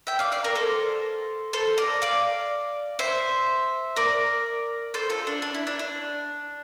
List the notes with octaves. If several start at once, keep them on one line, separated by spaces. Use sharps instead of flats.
E5 G5
D5 F5
D5 F5
A#4 D5
A4 C5
A4 C5
A#4 D5
D5 F5
C5 E5
A#4 D5
A4 C5
F4 A4
D4
D4
E4
D4
D4